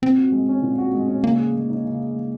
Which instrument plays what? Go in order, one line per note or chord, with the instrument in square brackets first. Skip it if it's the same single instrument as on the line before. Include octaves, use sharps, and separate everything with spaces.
[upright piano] A#2 [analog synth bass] C4
[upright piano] F#4
G#3
C#4
A#2
F#4
G#3
C#4
[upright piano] C#3 [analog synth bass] A#3
[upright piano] G#4
G#3
D#4
C#3
G#4
G#3